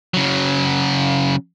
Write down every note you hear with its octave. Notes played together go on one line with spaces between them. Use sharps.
C#3 F#3